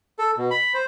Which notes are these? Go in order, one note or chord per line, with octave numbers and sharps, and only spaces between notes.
A4
B2
B5
C5